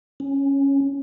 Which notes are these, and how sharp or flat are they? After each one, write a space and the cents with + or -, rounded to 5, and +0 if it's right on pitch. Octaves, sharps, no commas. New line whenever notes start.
C#4 -5